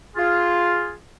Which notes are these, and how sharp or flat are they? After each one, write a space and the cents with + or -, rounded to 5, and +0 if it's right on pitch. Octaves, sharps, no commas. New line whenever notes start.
F4 +0 G#4 +0